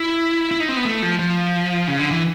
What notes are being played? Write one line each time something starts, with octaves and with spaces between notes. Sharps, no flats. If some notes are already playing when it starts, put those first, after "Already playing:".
Already playing: E4
E4
D#4
C4
B3
A3
F3
F3
C#3
D3
E3